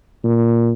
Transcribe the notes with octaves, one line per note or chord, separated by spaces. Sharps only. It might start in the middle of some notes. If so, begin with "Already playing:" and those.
A#2